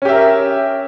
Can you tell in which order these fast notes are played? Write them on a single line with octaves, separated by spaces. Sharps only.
C#4 G4 E5 A#4